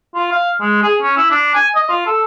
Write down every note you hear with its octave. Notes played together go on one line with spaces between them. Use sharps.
F4
F5
G#3
G#4
C#4
E4
D4
G#5
D#5
F4
A4